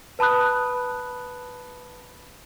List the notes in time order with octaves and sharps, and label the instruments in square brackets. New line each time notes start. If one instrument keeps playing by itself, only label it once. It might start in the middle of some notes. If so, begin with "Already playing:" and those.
[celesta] B4 A5 B5 D#6 F#6